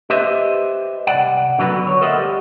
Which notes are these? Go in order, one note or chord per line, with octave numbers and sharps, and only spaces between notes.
G4 B4 C5 D#5 E5
C2 G#2 D5 F#5
D3 F#3 B3 F#4 B4
C#5
A4 A#4 C5 D#5 E5 F#5
G3 G4